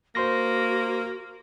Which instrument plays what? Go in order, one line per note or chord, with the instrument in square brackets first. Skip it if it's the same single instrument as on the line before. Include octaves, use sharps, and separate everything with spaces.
[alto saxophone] A#3 [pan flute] F#4 [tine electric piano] C5 C6 A#6